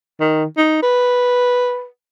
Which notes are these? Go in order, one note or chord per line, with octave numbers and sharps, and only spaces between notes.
D#3
D#4
B4